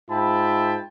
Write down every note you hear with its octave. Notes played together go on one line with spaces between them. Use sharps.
G#2 F4 E5 G5 A5 B5